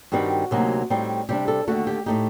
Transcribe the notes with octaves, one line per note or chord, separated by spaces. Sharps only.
G2 D#3 G3 C4 F#4
D2 C3 F#3 A#3 D#4
A2 G3 C4 D#4
C3 G3 D4 G4
A4
D#2 D3 A3 F#4
G4
A2 A3 D#4 G4